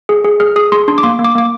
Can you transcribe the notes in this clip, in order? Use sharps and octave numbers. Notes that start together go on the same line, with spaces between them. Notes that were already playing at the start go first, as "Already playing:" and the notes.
G#4
G#4
G#4 F6
G#4 D#6
G#4 C6
D4 C6
D6
A#3 C6
A#3
D6
A#3 D6